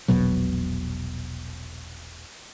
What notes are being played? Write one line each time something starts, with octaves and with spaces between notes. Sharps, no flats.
E1 A#1 B2 F#3